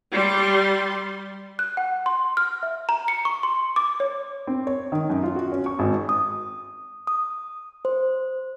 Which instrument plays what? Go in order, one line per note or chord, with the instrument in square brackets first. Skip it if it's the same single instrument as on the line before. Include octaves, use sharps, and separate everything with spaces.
[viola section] G3 C6
[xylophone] F#6
F#5
C6
F6
E5
A#5
C#7
C#6
C6
D6
C#5
[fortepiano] C4
C#5
D#3
F#2
F4
F#4
C#4
C#6
G#1
[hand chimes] D#6
D#6
C5